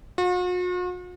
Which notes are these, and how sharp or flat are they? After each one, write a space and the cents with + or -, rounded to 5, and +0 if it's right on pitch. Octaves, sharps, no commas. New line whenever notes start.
F#4 -45